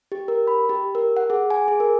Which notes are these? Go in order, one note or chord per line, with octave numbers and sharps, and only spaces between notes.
G4
A#4
B5
G4
A#4
F#5
G#4
G#5
G#4
A#4